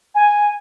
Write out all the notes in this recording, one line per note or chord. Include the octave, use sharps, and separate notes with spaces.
G#5